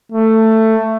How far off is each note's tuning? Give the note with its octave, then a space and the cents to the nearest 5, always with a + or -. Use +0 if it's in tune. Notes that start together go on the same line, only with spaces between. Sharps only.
A3 +10